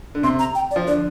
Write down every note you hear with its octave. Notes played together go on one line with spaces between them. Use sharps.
D3
C3 C6
A#5
G5
D5
F3
D3 D5